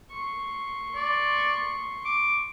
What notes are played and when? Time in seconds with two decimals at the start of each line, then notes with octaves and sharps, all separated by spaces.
0.11 C6 C#6
0.95 D5
2.05 D6